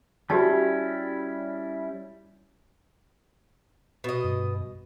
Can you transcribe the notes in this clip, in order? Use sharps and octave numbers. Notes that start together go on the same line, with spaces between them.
G3 C#4 E4 F#4 G4 A5
B2 D#5
G2